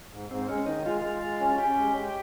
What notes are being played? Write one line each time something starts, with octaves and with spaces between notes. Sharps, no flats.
G#2
G#2 C4
G#3 C#4
D#3 D#4
G#3 F4
G#3
G#3
C#4
C#4 G4
G#3
G#3